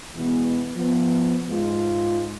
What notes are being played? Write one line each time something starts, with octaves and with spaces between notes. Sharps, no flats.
B2 E3 G#3 B3
F3 B3
G#2 G#3 F4